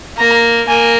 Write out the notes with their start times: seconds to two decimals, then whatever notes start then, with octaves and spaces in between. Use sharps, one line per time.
0.18 A#3 A#5
0.68 A#3 G#5